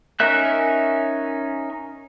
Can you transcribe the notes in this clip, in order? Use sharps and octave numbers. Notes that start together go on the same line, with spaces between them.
C#4 D#4 A#4 E5 F#6